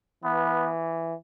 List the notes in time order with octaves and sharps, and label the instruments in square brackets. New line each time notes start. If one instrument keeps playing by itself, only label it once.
[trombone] E3 [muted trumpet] B3